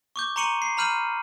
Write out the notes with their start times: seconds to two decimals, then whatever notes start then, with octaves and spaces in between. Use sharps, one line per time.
0.16 C#6 D6 G6
0.36 A#5 C6 C#6 C#7 D#7 F#7
0.62 C7
0.77 A#5 B5 F6 G6 D#7 F#7